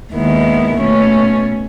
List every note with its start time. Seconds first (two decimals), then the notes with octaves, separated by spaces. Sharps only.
0.13 D#2 D#3 G#3 B3 E4
0.77 B2 A3 C#4